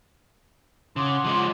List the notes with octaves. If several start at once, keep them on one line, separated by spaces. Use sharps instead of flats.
C#3 F#5 C6 D6
F3 G#3